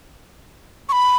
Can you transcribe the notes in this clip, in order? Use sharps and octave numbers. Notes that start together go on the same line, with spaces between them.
C#6
B5